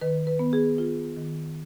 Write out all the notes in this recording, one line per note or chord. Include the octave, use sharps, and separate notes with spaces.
D#3 B4
B4
B3
G#4
F4
D#3